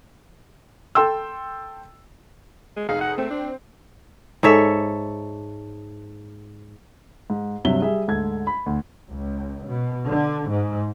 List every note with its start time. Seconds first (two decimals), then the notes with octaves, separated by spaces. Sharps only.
0.95 A4 G5 C6 E6
2.77 G#3
2.89 F1 D#4 G#4 F5
3.01 F#5
3.18 A3 C4
3.31 D4
4.43 G#2 A4 C#5 E5
7.30 G#2
7.65 G2 C3 F#3 E5 G7
7.82 G3 G#4 E5
8.07 D2 G#2 A4 G#6
8.47 B5
8.66 D2
9.09 C#2
9.67 B2
10.07 D3
10.50 G#2